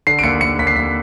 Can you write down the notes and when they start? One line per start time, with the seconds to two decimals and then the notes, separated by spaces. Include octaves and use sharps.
0.07 D3 C7
0.19 D7
0.24 D#2 C#7
0.41 D#2 C#7
0.59 D#2 B6
0.67 C7
0.76 D#2 B6